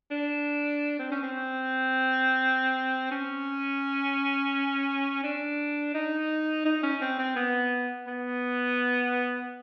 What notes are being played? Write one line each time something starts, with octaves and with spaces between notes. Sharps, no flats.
D4
C4
C#4
C4
C#4
D4
D#4
D#4
C#4
C4
C4
B3
B3